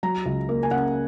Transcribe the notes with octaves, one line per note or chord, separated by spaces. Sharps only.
F#3 A#5
C#2
A#3
G#5
C#3 F#5